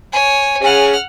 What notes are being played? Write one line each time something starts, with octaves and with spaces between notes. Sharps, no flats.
C#5 G#5
C#4 G#4 F#5 F6